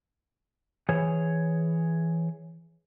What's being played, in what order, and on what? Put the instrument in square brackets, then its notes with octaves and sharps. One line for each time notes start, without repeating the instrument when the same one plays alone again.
[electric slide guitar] E3 G#4 C#5